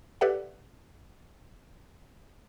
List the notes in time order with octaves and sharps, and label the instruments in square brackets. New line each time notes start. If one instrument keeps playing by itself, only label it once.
[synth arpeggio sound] G4 A4 B4 D5 E5 F#5